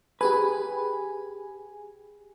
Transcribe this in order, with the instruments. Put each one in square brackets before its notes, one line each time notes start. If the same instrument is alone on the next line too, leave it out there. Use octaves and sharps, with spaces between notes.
[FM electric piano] G4 G#4 G#5 [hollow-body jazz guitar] B4